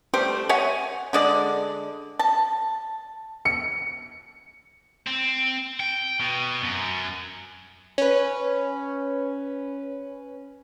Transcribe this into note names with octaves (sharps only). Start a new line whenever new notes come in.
G3 A3 G4 C5
C#5 E5 F#5 G#5
D3 G#3 D5
A5
C#7
C4
G5
B2
F#2
C#4 B4